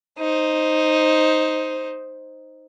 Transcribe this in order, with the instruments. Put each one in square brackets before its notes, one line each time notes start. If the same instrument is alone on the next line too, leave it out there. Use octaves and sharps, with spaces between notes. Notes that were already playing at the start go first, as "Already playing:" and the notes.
[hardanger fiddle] D#4 C5